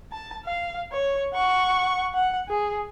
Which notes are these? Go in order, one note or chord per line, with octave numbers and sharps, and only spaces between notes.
A5
F5
C#5
F#5 C#6
F#5
G#4